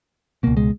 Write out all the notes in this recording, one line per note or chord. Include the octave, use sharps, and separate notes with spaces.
C#2 B2 A#3
G#3